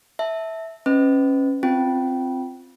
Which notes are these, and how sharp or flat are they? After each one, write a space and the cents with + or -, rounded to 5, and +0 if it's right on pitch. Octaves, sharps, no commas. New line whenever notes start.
E5 -15 A5 +0
C#4 -20 B4 +30 D#5 +0
C4 +0 F4 +0 G5 -15